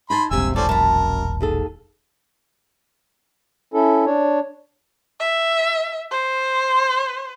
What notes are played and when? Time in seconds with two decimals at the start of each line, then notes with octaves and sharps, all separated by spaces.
0.10 D#4 G#5 A5 B5 C6
0.31 E1 A#1 G2 C3 G#5 E6
0.56 A2 C4 C#4 A4 D5
0.69 F#2 A#4 A5 B5
1.41 D#2 G#4 A4
3.74 C#4 E4 A4
4.06 D4 C#5
5.20 E5
6.11 C5